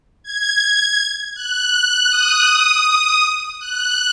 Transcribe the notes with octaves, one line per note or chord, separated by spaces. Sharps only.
G#6
F#6
D#6
F#6